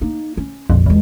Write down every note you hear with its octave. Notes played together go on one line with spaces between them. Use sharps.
A#3 D#4
C#4
A#1 F2
E2 D#3 G#3